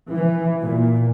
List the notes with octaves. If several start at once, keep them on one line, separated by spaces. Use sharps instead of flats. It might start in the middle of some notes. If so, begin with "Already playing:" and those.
E3
A#2